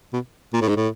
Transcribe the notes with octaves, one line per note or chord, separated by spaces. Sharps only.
B2
A#2
A2
G#2
A2